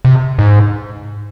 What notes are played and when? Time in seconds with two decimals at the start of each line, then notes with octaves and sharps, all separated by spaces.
0.05 C3
0.39 G#2